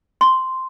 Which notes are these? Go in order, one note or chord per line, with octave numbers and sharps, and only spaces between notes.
C6